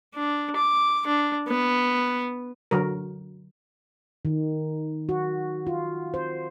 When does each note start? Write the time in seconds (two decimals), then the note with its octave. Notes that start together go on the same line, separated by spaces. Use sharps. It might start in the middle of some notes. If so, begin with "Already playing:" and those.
0.15 D4
0.56 D6
1.07 D4
1.48 B3
2.71 D3 F#3 A#4
4.25 D#3
5.09 F#4
5.67 F4
6.14 C5